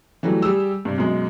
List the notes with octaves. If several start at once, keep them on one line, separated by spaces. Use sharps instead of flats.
E3 F#3 G3 A3
G3 G4 G#4 E6
G2 C3
F#2 B2 G#3